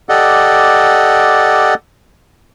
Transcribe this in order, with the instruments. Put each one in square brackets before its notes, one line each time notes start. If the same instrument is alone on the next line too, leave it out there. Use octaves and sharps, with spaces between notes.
[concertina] G4 A4 D5 D#5 F#5